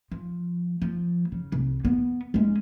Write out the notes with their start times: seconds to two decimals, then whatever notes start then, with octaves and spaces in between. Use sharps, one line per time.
0.12 F3
0.82 F3
1.32 C#3
1.52 C2
1.85 B3
2.34 G#3 C#4